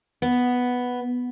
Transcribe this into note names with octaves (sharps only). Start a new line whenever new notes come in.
B3